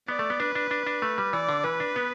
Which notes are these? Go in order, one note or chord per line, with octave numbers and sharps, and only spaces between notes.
B3 D5
A3
B3
D4 B4
D4
D4
D4
A3
G3
E3 D5
D3
E3 B4
D4
B3